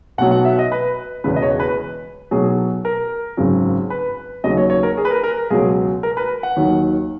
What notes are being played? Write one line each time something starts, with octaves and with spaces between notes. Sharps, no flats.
B1 B2 F#3 F#5
F#5
E5
D#5
B4
E1 E2 C#3 B4
D#5
C#5
B4
B1 B2 F#3 G#4
A#4
G#1 F#2 C#3 F#3
B4
D#2 C#3 F#3 D#5
C#5
C#5
A#4
G#4
B4
A#4
A#4
C#2 B2 F#3 G#4
A#4
B4
F#5
D#2 D#3 F#3